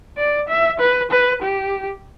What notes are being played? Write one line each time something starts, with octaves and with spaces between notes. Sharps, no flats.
D5
E5
B4
B4
G4